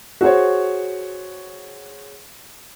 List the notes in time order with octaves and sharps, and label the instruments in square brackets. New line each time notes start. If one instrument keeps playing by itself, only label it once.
[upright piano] F#4 G#4 C5 C#5